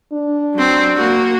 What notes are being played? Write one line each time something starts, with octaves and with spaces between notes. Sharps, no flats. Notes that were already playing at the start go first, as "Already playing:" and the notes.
D4
F#3 C4
A#3 F#4